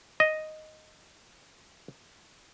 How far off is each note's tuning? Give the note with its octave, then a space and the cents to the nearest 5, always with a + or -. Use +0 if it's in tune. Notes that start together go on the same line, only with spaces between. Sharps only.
D#5 +0